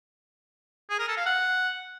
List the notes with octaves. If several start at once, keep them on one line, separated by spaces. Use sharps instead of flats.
G#4
A#4
A4
F5
F#5